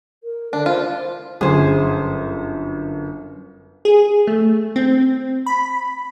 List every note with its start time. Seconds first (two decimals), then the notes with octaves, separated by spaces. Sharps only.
0.23 A#4
0.53 D3 D4
0.66 F4 C5
1.41 G1 F#2 G#4 C5
3.85 G#4
4.27 A3
4.76 C4
5.46 B5